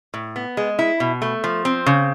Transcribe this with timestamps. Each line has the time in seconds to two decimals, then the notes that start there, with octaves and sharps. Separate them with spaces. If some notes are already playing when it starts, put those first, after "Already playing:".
0.14 A2
0.36 B3
0.57 G#3
0.79 E4
1.00 B2
1.22 A3
1.44 F3
1.65 C4
1.86 C#3